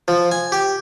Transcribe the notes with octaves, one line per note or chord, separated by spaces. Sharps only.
F3
G#5
G4